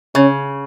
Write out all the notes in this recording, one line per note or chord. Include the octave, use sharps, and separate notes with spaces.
C#3 C#4